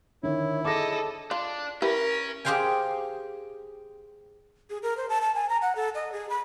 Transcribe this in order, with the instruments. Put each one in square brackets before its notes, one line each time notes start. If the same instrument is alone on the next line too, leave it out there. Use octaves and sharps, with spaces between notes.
[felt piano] D3 D#3 [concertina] E4 [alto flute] C#5
[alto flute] G#4 [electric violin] A4 D#5 [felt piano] D6 A#6
[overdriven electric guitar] D4 [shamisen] F4
[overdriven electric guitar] C#4 [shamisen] E4 G4 B4 [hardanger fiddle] A#4
[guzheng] G4 G#4 C5 F5 G5 G#5
[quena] G#4
A#4
C5
A5
A5
G#5
A#5
F#5
A4
D#5
G#4
B5